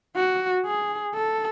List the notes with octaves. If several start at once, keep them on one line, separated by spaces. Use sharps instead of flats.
F#4
G#4
A4